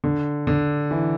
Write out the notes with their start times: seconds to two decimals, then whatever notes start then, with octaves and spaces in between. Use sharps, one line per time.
0.04 D3
0.47 D3
0.91 E3